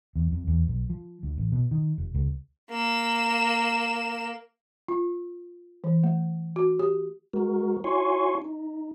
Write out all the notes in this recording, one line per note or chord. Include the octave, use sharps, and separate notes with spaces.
E2
F2
E2
B1
F3
D2
A1
B2
D#3
F1
C#2
A#3 E7
F4
E3
A3
F#4
G4
G#3 F#4 A#4
E4 F#4 C#5 G#5 C6 C#6
D#4